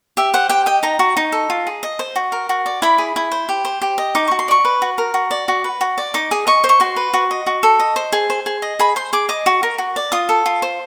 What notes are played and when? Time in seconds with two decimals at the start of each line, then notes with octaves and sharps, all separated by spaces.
0.17 G4 E5
0.34 C5 F#5
0.49 G4 G5
0.66 D#5 G5
0.83 D#4 A#5
0.99 F#4
1.17 D#4
1.32 A4
1.50 F4
1.67 G#4
1.83 D#5
1.99 C5
2.16 F#4
2.32 A#4
2.49 F#4
2.66 D5
2.82 E4 B5
2.98 G#4
3.16 E4
3.32 C5
3.49 G4
3.65 C5
3.82 G4
3.98 D#5
4.15 D#4 D6
4.28 F#4 C#6
4.39 C6
4.48 D5 C#6
4.65 B4
4.82 F#4
4.98 A#4
5.14 F#4
5.31 D5
5.48 F#4
5.64 B4
5.81 F#4
5.98 D5
6.14 D#4 D6
6.31 G#4
6.47 D#5 C#6
6.64 C5
6.69 C#6
6.80 F#4 C6
6.96 B4
7.14 F#4
7.31 D#5
7.47 F#4
7.63 A4
7.79 D#5
7.96 C5
8.12 G#4
8.30 C5
8.46 G#4
8.62 D#5
8.79 G#4 B5
8.96 C5 C6
9.13 G#4 D6
9.29 D#5 D6
9.46 F#4
9.63 A#4
9.78 F#4
9.96 D5
10.12 F4 D#6
10.29 A4
10.46 F4
10.62 C5